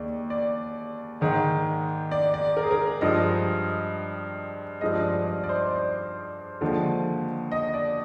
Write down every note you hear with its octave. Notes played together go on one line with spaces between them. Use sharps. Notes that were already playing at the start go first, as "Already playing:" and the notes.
Already playing: D#2 G#3 D5
D5
G#2 D#3 G#3
D5
D5
A#4
G#4
A#4
G2 F3 G#3 D#5
G2 F3 G#3 D#5
D5
D5
D5
C5
D5
D#2 D3 F3 G#3
D#5
D5